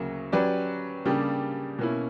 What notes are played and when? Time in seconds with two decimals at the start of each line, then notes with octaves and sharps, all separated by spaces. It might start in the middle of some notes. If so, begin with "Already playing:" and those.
Already playing: D2 C#3 F#3 A#3
0.32 F#3 C#4 G4 B4 D5
1.05 C#3 G3 A#3 D4 G4
1.79 B2 A#3 C#4 E4